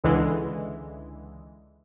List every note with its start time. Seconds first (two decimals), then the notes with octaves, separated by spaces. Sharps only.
0.04 C#2 D3 E3 G#3